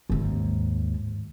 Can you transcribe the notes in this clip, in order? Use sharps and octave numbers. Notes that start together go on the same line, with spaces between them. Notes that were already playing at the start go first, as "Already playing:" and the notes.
D#2 G#2